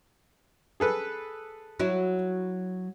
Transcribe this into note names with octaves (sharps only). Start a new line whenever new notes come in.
G#4 A4 B4
F#3 E4